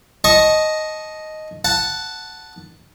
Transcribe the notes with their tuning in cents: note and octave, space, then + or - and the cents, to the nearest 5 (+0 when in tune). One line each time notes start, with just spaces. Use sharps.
D#5 +0 A5 -20 C#6 -20
F#5 +0 A5 +0